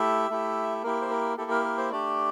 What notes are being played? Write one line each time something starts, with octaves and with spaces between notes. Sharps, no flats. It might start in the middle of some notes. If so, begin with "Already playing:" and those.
Already playing: A3 E4 G4 E5
A3 E4 G4
A#3 E4 G4 A#4
C5
A#4
A#3 E4 G4 A4
A#4
A#4
C5
A3 D4 G4 D5